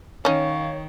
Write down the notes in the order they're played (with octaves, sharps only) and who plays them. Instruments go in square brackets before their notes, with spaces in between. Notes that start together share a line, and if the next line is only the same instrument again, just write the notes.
[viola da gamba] D#3 [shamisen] C#4 D#4 [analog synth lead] C#5 [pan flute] F5